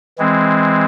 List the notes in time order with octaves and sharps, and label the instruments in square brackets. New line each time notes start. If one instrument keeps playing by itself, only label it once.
[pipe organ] E3 G#3 C4